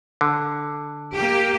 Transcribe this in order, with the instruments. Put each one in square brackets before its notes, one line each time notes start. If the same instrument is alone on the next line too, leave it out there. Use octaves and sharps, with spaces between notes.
[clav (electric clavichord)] D3
[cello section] A#3 G4